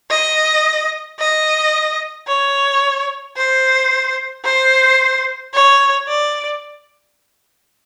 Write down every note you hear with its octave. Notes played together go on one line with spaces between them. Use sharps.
D#5
D#5
C#5
C5
C5
C#5
D5